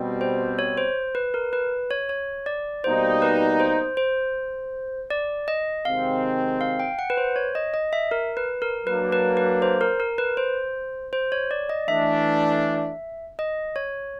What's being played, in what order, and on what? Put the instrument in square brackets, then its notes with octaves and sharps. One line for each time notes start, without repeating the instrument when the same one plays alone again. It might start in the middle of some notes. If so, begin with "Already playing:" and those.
Already playing: [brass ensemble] B2 G3 C4
[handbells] C5
C#5
C5
B4
A#4
B4
C#5
C#5
D5
[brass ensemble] B2 G3 A#3 D#4 [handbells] C5
[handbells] B4
C5
C5
D5
D#5
[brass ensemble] C3 D#3 G#3 C4 [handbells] F5
[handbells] F5
G5
F#5
B4
C5
C#5
D#5
D#5
E5
A#4
B4
A#4
[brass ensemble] F#3 A#3 D4 [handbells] B4
[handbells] B4
B4
C5
A#4
A#4
B4
C5
C5
C#5
D5
D#5
[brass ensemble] E3 A3 D4 [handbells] E5
[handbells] D#5
C#5